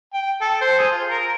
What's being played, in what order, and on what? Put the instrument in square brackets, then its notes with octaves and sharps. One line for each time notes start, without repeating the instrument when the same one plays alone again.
[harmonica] G5
A4
C5
G#4
F4
A#4